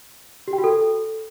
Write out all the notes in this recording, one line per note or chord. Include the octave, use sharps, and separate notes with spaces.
G4
G5
F#4
A4